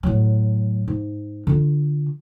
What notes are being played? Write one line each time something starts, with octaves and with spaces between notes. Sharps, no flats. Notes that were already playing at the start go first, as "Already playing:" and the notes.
A2 F#3
G#2
D3 F4